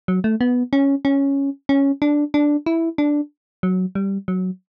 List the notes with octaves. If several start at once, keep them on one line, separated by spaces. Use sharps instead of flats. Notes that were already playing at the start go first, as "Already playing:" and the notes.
F#3
A3
B3
C#4
C#4
C#4
D4
D4
E4
D4
F#3
G3
F#3